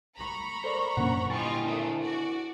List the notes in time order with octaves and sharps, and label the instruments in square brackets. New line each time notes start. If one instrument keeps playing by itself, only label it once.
[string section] A#5 B5 C#6
[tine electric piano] A4 A#4 D5 [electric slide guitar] C5
[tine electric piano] F#2 F#5 [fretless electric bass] A#2 D3 A#3
[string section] G3 F4 D#5 [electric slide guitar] E4 G#5 [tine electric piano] A6
[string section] G#1 A3 [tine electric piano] D4
[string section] F#4 D5